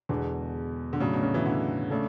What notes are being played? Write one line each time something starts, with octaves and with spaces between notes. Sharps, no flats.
E2 B2 D3 G#3
D3
A2 C#3 F#3 A3 D4
B2
C#3
E3
D3
C#3 A3 D4 A4